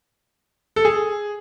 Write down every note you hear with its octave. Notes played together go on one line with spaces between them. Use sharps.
A4
G#4